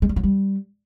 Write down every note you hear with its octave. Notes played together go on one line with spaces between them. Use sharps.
G#3
G3
F#3
G3